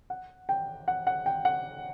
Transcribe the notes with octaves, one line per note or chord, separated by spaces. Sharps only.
F#5
G5
F#5
F#5
G5
F#5